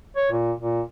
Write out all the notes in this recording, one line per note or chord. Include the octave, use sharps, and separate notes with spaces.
C#5
A#2
A#2